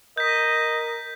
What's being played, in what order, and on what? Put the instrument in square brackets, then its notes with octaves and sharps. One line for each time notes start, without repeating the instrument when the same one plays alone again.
[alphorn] A#4 [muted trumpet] D#5 [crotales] G6 B6